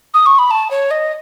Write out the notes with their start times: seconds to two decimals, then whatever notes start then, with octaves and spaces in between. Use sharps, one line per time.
0.14 D#6
0.26 C#6
0.38 B5
0.51 A5
0.71 C#5
0.91 D#5